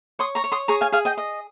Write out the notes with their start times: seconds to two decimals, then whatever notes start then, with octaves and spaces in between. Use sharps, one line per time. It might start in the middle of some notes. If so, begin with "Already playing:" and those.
0.19 C#5 C6 D#6
0.35 A#5 C#6
0.44 C#5
0.52 C6 D#6
0.68 G#4 A#5 C#6
0.81 F5 G#5
0.92 G#4 F5 G#5
1.05 D#5 G5
1.17 D#5